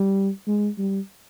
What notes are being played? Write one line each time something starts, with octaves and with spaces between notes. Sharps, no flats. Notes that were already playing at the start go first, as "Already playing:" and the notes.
Already playing: G3
G#3
G3